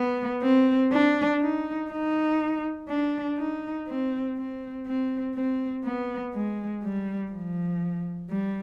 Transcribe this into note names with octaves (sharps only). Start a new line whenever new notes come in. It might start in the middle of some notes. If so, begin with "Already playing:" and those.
Already playing: B3
C4
D4
D#4
D#4
D4
D#4
C4
C4
C4
C4
B3
G#3
G3
F3
G3